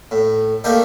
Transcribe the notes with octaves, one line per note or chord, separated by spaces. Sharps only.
A2
A3 A#3 D4 D#4 G4 D#5